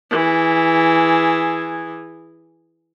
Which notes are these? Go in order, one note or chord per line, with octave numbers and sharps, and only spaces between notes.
E3 G#4